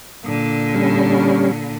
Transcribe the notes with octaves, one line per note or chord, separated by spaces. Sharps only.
A#2 D3
G3 C#4